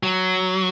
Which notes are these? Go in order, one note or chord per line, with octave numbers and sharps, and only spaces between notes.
F#3